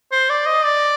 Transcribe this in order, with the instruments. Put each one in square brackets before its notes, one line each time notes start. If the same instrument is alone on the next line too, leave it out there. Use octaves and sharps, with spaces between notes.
[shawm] C5
D5
D#5
D5